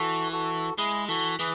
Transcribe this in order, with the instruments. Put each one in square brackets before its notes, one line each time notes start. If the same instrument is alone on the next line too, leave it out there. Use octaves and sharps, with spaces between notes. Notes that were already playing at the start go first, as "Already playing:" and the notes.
Already playing: [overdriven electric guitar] E3 [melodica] F#4 A4
[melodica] F#4 A4
[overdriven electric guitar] G#3 [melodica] E4 G#4
[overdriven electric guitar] E3 [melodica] F#4 A4
[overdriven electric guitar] E3 [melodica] G#4 B4